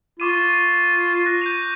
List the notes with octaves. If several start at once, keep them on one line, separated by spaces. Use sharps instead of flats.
F4 C#6 D6 D#7
F#6 A#6
G6 D#7 F7